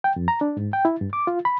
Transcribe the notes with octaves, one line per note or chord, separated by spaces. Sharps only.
G5
F2
A#5
D4
G#2
G5
E4
G2
D6
F4
B5